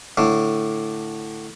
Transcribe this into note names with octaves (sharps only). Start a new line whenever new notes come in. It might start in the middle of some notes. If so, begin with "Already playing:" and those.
A2 D3